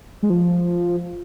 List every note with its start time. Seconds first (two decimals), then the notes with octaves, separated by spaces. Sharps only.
0.23 G#3
0.30 F3